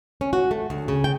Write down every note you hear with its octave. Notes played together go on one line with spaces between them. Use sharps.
C#4
F#4
A3
D2
C#3
G5